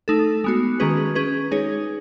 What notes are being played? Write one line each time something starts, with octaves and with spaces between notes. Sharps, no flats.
A3 D#4 A4
G#3 B3 F#4
D#3 G#3 C#4 G#4 B4
C#4 G#4 B4
G#3 D#4 G#4 C#5